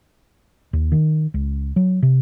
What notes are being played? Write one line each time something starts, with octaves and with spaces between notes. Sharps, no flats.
D#2
D#3
C#2
F#3
C3